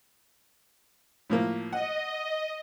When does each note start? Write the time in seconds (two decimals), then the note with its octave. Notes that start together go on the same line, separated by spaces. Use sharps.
1.30 A2 F3 A#3
1.72 D#5 F#5